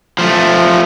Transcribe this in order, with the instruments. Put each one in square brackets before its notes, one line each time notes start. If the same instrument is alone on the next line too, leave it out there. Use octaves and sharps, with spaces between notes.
[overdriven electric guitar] F3 A3